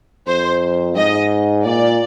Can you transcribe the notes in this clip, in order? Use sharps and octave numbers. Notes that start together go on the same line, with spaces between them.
F2 C5
G#2 D#5
A#2 D5